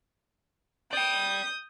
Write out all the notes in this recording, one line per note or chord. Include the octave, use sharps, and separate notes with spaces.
D5 G5 D#6 G6